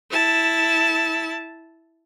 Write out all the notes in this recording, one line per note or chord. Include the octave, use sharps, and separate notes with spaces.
E4 A5